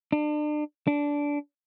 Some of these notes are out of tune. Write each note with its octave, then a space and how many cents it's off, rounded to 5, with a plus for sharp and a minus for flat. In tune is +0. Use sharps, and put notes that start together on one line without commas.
D4 +35
D4 -15